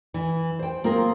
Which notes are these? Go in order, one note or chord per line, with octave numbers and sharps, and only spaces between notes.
E3
C5 G5
A#3 C4 F4 G#4 A#4